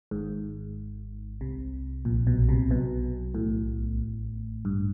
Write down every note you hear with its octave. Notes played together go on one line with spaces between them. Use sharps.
G#1 G#2
C2 C3
A#1 A#2
B1 B2
C2 C3
B1 B2
A1 A2
G2